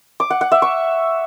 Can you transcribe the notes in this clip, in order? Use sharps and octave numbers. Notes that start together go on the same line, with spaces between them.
D6
F#5
F#5
E5
C#6